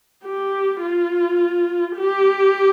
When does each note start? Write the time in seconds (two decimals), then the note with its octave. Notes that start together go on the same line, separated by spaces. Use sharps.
0.24 G4
0.82 F4
1.97 G4